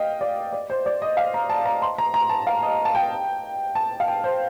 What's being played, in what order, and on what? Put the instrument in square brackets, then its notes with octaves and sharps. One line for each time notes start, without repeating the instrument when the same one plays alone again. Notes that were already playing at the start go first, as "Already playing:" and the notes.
Already playing: [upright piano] D#5 F5 G5
D5
D5
C5
D5
D#5
F5
A#5
A5
A#5
C6
A#5
A#5
A5
F5
D#5
A5
G5
A5
F5
G5
C5